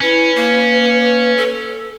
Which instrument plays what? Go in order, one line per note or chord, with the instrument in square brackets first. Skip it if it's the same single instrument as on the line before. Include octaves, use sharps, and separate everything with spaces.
[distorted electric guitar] C#4 [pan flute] E4 [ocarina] B4
[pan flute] A#3
A4